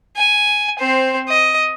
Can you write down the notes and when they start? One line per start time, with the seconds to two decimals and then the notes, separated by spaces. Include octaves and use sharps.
0.17 G#5
0.79 C4 C5
1.29 D#5